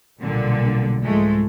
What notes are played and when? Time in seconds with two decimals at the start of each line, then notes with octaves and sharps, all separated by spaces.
0.22 B1 A#2 D3 G3
1.05 C2 G#2 F3 G#3 A3